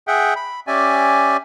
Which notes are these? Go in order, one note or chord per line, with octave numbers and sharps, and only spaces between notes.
G#4 E5 F#5 G5
B5
C#4 G4 D5 E5 G#5